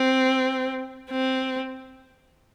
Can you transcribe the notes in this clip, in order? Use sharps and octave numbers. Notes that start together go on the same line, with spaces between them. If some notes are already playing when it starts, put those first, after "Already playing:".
Already playing: C4
C4